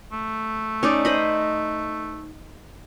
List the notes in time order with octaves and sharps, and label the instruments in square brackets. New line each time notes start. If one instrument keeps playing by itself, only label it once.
[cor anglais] A3
[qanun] C#4 D#4 D5
C5 D#5 B5